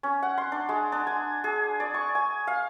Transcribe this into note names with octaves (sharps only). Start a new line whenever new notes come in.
C#4
F#5
C6
D4
G#3
D4
G#5
G#4
D5
C#6
G#5
F5